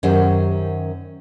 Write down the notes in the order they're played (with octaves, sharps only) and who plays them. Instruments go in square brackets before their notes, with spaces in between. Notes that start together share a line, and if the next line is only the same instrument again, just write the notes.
[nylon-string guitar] F#2 D#3 C#4 G4 C5 F#5